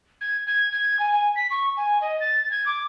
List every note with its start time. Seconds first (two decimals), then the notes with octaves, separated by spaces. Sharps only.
0.21 G#6
0.47 G#6
0.72 G#6
0.99 G#5
1.13 G#5
1.36 B6
1.51 C#6
1.77 G#5
2.01 D#5
2.20 A6
2.51 G#6
2.66 D6